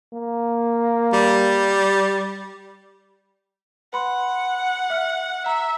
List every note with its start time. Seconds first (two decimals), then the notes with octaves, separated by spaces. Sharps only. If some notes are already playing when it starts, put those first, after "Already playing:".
0.13 A#3
1.13 G3
3.93 B4 F#5 B5 C6
4.90 E5 F6
5.46 E5 A#5